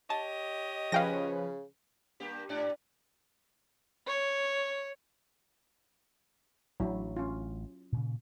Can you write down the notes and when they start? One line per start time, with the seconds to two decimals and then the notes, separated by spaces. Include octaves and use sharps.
0.10 G4 C#5 D#5 A5
0.92 C#3 F3 C#4 B4 F5 G5 A#6
2.20 G2 A#3 G4
2.49 G#2 D4 D5
4.07 C#5
6.80 A1 F#3 D4 E4
7.16 C#4 F4
7.92 A#2 C#3